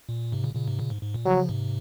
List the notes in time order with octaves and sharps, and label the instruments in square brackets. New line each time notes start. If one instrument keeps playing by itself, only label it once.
[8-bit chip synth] A#2
G#2 C3
A#2 C#3
A#2 C#3
G#2 C3
A#2 C#3
G#2
G#2
A#2
[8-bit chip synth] C#3 F3 [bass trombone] F#3
[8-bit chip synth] G#2 C3